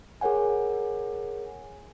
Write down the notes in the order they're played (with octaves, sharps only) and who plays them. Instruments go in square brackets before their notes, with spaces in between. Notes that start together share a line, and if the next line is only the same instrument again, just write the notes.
[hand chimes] G#4 A#4 C#5 F#5 G#5